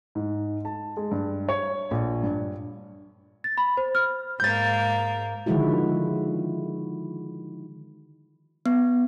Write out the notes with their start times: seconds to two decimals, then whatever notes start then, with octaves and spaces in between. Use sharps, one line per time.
0.15 G#2
0.65 A5
0.97 G#3
1.11 G2
1.49 C#5
1.91 A#1
2.23 G2
3.44 A6
3.58 B5
3.77 C5
3.95 F6
4.40 G#2 A#3 G6 A6
5.46 D3 D#3 F3 G#3 E4 F#4
8.66 B3